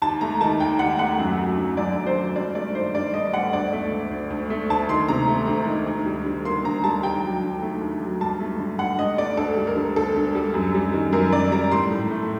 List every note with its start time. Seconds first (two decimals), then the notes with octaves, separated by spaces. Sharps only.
0.02 D#2 A5
0.21 A3 A#5
0.41 D#3 A5
0.60 D#2 G5
0.79 D#2 F#5
0.99 A3 F#5
1.19 F#2
1.38 F#3
1.58 D3
1.77 F#2 D5
1.97 F#2
2.06 C5
2.16 F#3
2.35 G2 D5
2.55 A3 D5
2.74 D#3 C5
2.95 G2 D5
3.14 G2 D#5
3.33 A3 F#5
3.53 D2 D5
3.73 A3
3.91 D3
4.11 D2
4.30 D2
4.50 A3
4.70 D2 A5
4.89 D#3 C6
5.09 C3 A#5
5.28 A3
5.47 D2
5.67 D#3
5.87 D2
6.06 G3
6.26 D3
6.45 A#3 C6
6.64 D2 A#5
6.84 G3 A5
7.03 D#2 G5
7.24 F#3
7.43 D3
7.62 A3
7.81 D#2
8.01 F#3
8.20 G2 A5
8.40 A3
8.59 D3
8.78 G2 F#5
8.98 G2 D#5
9.18 A3 D5
9.37 D2 A4
9.57 G3
9.67 A#4
9.76 D3
9.96 D2 A4
10.16 D2
10.35 G3
10.54 F#2
10.74 G3
10.93 D#3
11.12 F#2 A#4
11.32 F#2 D5
11.52 G3 A#5
11.72 A2 C6
11.91 A2
12.11 A3